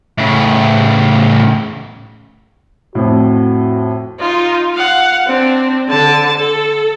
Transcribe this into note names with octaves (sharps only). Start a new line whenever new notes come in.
A2 C#3
F2 A2 F#4
D#4 F4
F5 F#5
C4 D4
D3 A5
A4